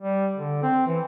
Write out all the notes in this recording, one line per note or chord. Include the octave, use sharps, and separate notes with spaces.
G3
D3
C4
E3